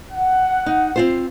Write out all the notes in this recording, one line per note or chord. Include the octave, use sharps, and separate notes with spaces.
F#5
D#4
C4 F4 C5